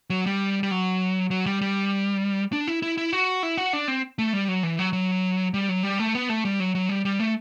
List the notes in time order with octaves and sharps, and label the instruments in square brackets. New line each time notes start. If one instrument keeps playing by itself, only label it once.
[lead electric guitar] F#3
G3
G3
F#3
F#3
G3
G3
D4
E4
E4
E4
F#4
E4
F#4
D4
C4
A3
G3
F#3
E3
F#3
F#3
G3
F#3
G3
A3
B3
A3
G3
F#3
F#3
G3
G3
A3